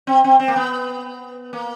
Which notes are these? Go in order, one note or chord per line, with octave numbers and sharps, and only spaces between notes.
C4
C4
C4
A#3
B3
A#3